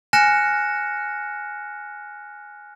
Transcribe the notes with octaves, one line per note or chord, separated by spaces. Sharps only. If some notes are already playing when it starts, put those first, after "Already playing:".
G#5 F6 F#6 A#6 C#7 E7